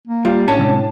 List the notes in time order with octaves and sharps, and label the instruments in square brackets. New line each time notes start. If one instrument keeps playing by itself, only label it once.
[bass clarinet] A#3
[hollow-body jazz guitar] G3 [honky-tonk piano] F4
[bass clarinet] A2 [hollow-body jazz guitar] C#4 [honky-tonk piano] D4 A5
[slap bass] C3 G#3 C4